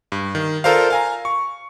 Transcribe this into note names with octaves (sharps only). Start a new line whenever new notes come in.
G2
D#3
F4 A4 A#4 C5 D5 F5
F5 G#5 A#5
C#6